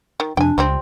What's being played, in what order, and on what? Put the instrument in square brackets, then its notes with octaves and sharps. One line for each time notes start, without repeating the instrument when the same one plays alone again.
[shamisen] D#3
[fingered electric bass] F2 C3 [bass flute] D4 [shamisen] G5 G#5
[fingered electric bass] C#2 [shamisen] F3 G3 C4